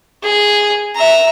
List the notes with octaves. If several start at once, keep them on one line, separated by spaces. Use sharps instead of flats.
G#4
E5 A#5